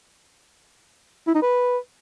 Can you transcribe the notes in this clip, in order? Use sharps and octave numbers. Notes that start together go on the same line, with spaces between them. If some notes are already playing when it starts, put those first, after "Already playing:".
E4
D#4
B4